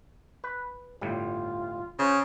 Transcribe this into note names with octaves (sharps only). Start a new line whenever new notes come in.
B4
G1 A2 G3 F4
C#3 C5